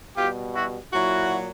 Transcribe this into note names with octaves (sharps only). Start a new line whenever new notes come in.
B2 G3 F4 G4
E4 F#4
A#2 F#3 E4 F#4